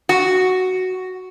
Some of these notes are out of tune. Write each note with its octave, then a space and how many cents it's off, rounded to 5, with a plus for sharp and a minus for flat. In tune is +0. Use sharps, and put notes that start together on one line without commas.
F#4 +5